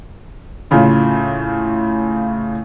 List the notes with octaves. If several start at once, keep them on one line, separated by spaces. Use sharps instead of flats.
A2 C#3 F4